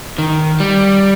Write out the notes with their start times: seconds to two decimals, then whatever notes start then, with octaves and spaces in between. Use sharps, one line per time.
0.18 D#3
0.60 G3